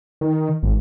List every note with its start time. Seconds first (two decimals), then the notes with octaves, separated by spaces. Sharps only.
0.21 D#3
0.63 G#1